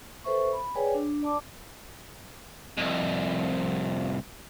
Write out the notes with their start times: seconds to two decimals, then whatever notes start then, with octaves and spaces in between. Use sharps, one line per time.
0.24 A4 B4 C5 E5 C#6
0.52 B5
0.75 G#4 B4 C#5 D5 G5 G#5
0.94 D4
1.23 D5 A5 D6
2.78 C2 F2